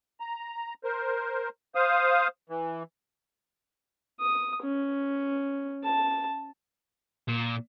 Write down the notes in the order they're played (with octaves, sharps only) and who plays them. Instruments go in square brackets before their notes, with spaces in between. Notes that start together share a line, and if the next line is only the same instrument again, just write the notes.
[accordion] A#5
A#4 C5
C5 F5 D#6
E3
[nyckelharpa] D#6
C#4
A5
[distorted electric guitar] A#2